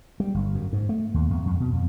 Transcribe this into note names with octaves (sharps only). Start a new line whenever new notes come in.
G3
G1
F#2
G#2
A3
D#2
E2
F2
B2
F2